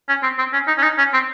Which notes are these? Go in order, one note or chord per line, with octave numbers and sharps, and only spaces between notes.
C#4
C4
C4
C#4
D#4
C#4
D#4
C#4
C4